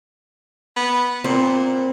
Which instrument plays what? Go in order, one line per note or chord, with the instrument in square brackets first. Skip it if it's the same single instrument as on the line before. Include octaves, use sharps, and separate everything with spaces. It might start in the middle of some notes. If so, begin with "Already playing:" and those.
[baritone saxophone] B3
[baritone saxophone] A#2 [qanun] C4